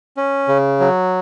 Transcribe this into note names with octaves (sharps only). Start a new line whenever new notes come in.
C#4
C#3
F#3